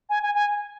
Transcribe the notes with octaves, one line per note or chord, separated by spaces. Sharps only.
G#5
G#5
G#5